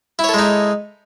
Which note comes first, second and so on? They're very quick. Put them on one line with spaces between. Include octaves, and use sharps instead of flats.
E4 C#5 A4 G#3 D#4